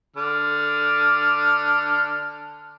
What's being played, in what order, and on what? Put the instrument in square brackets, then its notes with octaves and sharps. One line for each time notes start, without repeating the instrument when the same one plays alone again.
[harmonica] D3 D4 F6